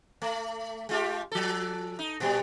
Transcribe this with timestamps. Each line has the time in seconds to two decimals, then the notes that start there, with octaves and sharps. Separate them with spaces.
0.22 A3
0.89 G#3 F4 G4
1.32 F3 A4
1.99 D#4
2.20 A#2 G3